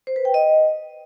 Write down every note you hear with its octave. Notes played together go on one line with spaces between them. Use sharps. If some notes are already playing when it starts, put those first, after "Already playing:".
C5
B4
G5
D#5